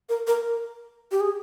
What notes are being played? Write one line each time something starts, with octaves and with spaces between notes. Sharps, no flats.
A#4
A#4
G4
G#4